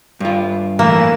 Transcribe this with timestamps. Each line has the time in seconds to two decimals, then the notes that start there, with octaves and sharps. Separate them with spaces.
0.20 G2 F4
0.79 A2 E3 A#3 E7